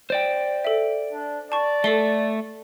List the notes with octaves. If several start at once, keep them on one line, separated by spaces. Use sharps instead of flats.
C5 D5 G5
A4 E5
D4
D5 A5 C#6
A3 A4 C7 G7